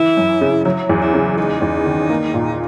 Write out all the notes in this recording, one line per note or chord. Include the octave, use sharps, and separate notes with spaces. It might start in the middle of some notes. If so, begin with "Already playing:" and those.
Already playing: E3 E4
F#2
C#3
F#3 E4
E2
E4
C#3
G#3 D#4
E2
D#3
A#3
A#2